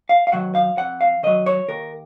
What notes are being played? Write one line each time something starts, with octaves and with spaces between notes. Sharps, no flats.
F5
F5
D#3 F#3 F#5
F5
F2 F#5
F5
D#3 F#3 D#5
C#5
D#2 A#4